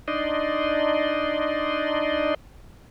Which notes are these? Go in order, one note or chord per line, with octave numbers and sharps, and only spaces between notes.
D4 D#4 D5 D#5 C6